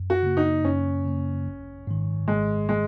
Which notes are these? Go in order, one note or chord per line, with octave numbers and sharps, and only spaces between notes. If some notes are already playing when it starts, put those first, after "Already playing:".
Already playing: F#2
F#4
C#3 A#3
D#4
F#2 C#4
C#3 A#3
G#1
G#2 D#3
G#1 G#3
G#3